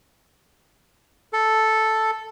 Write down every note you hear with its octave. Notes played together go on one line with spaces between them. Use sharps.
A4